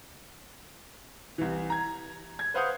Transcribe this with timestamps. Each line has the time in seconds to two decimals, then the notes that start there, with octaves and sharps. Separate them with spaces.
1.38 C2 E3
1.70 A#5 G#6
2.39 G#6
2.54 B4 C5 F5 F#5 D#6 G6